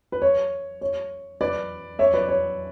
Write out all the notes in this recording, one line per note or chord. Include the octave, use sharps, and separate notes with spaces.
B4
C#5
C#5
B4 D5
C#5 E5
B4 D5
C#5